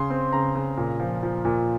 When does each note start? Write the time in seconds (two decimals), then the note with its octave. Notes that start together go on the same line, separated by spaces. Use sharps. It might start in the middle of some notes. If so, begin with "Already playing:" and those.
Already playing: C#3 C6
0.10 C4
0.33 C#3 A#5
0.55 C#3
0.77 A#2
1.00 F3
1.23 F3
1.45 A#2